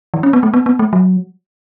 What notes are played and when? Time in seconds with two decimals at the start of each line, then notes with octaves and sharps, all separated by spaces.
0.14 E3
0.23 C#4
0.33 B3
0.43 A3
0.54 B3
0.66 B3
0.79 A3
0.93 F#3